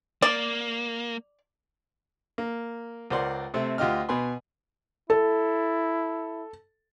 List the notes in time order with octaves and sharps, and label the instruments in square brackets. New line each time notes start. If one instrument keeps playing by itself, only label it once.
[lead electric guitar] A#3 [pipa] D5
[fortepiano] A#3
C#2 A#4 C5 D5 F#5 C6
C3 A3 C4
D2 F4 G4 D#5 F6
B2 B4 G#5 C6
[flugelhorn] E4 [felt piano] A4